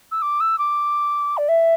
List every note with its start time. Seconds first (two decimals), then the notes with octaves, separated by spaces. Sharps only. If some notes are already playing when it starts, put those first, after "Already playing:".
0.11 E6
0.22 D6
0.40 E6
0.58 D6
1.37 D5
1.49 E5